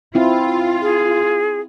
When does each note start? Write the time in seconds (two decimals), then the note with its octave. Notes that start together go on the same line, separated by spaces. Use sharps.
0.15 C4 E4 F4
0.81 G#4